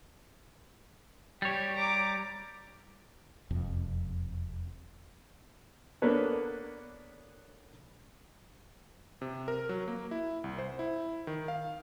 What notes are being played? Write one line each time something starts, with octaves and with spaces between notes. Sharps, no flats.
G3 G4 C#5
A#5 D6
E1 F2 C3
A#3 B3 D4 A4 B4 C#5
C3
A#4
F#3
A#3
E4
C2
C5
E4
D#3
F5